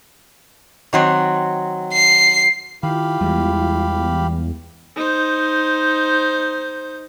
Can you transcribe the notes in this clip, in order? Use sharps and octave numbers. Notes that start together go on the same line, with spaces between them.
D#3 F#3 C4
C7
D#3 E4 F4 G4 F5 B5
E2 G3 G#3
D#4 C5